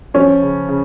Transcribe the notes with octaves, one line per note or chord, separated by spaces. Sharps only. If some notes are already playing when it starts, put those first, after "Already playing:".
F3 C#4
C#3
C#3